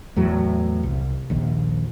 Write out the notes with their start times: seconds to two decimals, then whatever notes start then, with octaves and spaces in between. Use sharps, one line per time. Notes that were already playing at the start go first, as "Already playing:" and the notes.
0.16 E2 A2 F#3
0.83 C2
1.30 A#1 D#2